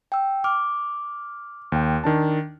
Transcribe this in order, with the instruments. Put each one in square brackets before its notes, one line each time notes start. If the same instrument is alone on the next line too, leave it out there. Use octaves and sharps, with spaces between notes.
[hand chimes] G5 E6
[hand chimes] D6 [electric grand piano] F6
[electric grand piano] D#2 G5
D#3 D4 A5